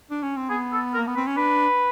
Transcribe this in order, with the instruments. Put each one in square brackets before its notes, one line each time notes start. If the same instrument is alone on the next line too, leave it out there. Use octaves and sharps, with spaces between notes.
[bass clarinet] D4
C#4
C4
[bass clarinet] B3 [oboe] G#4
[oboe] A4
A#4
[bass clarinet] A#3
B3
[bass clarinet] C4 [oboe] B4
[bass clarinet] C#4
[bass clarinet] D4 [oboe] B4